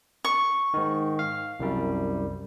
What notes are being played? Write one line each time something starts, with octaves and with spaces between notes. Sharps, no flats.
C#6
G#2 D#3
F5
C2 F#2 G3